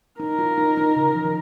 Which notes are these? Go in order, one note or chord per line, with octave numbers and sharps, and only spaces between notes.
D#4 A#4
F4
D#4
D#4
C#3
F3
D#3